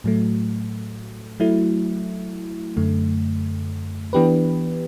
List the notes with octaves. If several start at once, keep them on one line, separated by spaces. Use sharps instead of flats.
A2 F#3 A3
F#3 A3 E4
F#2 D3 A3
E3 B3 D4 G4 B4